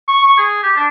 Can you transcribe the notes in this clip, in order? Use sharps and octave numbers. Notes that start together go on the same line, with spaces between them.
C#6
C#6
G#4
G4
D4